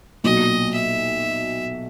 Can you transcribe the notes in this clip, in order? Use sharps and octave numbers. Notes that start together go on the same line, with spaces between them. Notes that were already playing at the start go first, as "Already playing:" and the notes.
B1 A#2 F#3 D#5
E5